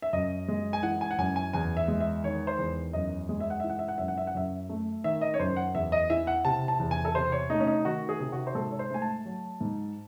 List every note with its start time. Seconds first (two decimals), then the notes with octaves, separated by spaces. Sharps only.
0.02 E5
0.13 F#2 D#5
0.48 G#3
0.73 G#5
0.83 E3 F#5
1.01 G#5
1.11 F#5
1.18 F#2 G#5
1.36 G#5
1.53 E2 G#5
1.77 E5
1.88 G#3
2.00 E5
2.24 D#3 C#5
2.47 C5
2.58 E2
2.93 F#2 D#5
3.29 G#3
3.40 E5
3.50 F#5
3.60 E3 E5
3.69 F#5
3.79 E5
3.88 F#5
3.98 F#2 E5
4.08 F#5
4.18 E5
4.27 F#5
4.35 F#2 E5
4.69 A3
5.04 D#3 E5
5.21 D#5
5.34 C#5
5.39 F#2 C5
5.56 F#5
5.75 E2 E5
5.92 D#5
6.10 E3 E5
6.27 F#5
6.45 C3 A5
6.68 A5
6.80 E2
6.91 G#5
7.05 A4
7.15 C3 C5
7.32 C#5
7.50 A3 D#4
7.60 C#4
7.67 D#4
7.85 D#3 F#4
8.09 G#4
8.20 C3
8.32 F#4
8.47 C5
8.55 G#2 A4
8.71 C#5
8.79 C5
8.90 A3 G#5
9.02 A5
9.26 F#3
9.61 G#2